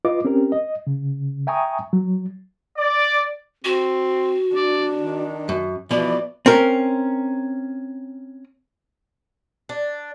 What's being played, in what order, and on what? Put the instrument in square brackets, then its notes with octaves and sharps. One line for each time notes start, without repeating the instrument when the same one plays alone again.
[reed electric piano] F4 B4 D#5 D6
C4 C#4 G4 A#4
D#5
C#3
E5 G5 G#5 A#5 C#6 D#6
F#3
[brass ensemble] D5
[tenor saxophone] C4 [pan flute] F#4
[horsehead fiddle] D4 [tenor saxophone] D5
[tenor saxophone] D#3
[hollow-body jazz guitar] F#2
[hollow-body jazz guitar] B2 F3 [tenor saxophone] E3 [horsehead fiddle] D5 [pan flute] B5
[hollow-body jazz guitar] C4 C#4 A#4
[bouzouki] D4